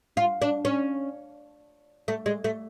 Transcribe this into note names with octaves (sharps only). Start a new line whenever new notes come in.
F4
D4
C#4
A3
G#3
A3